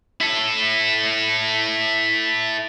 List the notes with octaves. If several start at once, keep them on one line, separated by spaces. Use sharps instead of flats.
E4 A4